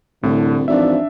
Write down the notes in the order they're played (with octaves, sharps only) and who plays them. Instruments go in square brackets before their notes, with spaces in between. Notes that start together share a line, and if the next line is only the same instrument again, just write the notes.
[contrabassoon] C2 [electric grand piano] A2 [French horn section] D3
[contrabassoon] G#1 [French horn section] E3 F3 D5 [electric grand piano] D4 E5